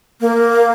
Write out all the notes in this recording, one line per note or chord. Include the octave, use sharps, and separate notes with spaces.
A#3